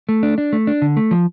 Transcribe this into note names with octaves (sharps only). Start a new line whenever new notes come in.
A3
D4
D4
A3
D4
D3
A3
F3